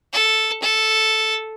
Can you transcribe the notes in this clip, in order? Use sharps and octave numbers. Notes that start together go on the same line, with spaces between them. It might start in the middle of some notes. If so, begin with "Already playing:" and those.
A4
A4